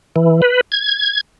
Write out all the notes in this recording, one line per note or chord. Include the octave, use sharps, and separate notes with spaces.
E3
B4
G#6